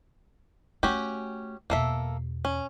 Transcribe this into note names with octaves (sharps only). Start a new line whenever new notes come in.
A3 C#4 F#4 G4
E2 B2 A#3 A4 E5
C#4